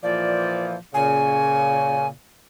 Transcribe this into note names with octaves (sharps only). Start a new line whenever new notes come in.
A#2 E3 F3 D5
A#2 C#3 G#5